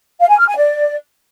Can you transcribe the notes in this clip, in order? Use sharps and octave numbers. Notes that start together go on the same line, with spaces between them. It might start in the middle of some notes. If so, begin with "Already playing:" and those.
F5
G#5
F6
G#5
D5